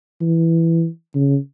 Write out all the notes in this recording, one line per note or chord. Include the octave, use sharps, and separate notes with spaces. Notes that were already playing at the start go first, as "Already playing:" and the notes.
E3
C#3